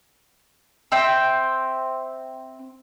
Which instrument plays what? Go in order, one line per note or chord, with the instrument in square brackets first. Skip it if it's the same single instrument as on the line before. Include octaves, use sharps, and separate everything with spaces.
[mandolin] C4 E5 G5